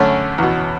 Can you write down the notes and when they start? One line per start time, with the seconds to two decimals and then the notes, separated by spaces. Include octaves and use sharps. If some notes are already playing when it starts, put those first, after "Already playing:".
Already playing: F#2 D3 A3 C#4
0.38 E2 B2